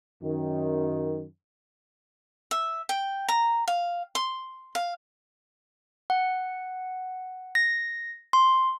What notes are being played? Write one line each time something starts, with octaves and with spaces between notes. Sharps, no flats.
F#2 D#3
E5
G5
A#5
F5
C6
F5
F#5
A#6
C6